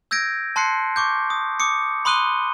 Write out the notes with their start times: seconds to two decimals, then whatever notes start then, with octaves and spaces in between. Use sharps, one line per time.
0.11 E6 G6 G#6 A#6 D7
0.56 A5 C6 F#6 C7 C#7
0.96 C#6 D6 G6
1.30 D#6
1.60 D6 D#6 C#7
2.05 B5 C6 D#6 F#6 D#7 G7